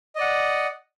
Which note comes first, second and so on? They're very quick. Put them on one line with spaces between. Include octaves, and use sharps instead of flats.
D#5 D5 F#5